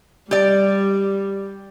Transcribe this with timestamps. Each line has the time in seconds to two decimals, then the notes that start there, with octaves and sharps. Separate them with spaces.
0.31 G3 G4 D5